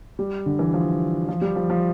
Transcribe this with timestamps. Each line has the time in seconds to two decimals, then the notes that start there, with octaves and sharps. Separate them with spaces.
0.19 G3
0.46 D3
0.59 E3
0.74 F3
1.29 F3
1.42 G3
1.56 F3
1.70 F3